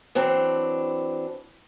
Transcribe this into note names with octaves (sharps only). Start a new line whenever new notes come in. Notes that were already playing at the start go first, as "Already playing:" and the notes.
E3 F#3 C4 D4